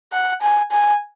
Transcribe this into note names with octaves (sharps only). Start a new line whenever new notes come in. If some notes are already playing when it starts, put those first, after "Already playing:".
F#5
G#5
G#5